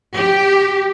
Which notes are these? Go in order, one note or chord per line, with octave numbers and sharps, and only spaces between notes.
G4